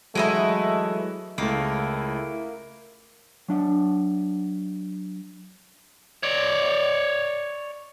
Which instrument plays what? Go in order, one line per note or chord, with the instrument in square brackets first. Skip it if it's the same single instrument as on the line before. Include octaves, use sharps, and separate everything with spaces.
[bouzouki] E3 D#4 E4 [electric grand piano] F#3 G#3 [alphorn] A3
[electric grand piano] C#2 A3 [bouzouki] A#3 [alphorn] E4
[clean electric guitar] F#3 D4 F#5
[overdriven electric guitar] C#5 D5